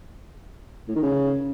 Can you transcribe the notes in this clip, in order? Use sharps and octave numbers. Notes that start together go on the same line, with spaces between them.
A2
D#3
C#3